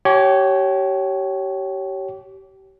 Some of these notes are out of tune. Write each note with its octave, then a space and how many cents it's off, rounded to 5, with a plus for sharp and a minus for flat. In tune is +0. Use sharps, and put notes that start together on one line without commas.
G4 -30 C#5 +0 G#5 +30